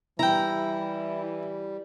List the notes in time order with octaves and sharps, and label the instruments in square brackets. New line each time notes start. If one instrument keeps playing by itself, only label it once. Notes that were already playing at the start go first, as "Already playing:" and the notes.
[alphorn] E3 [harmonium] G3 [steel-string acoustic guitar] E4 [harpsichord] G5 A#5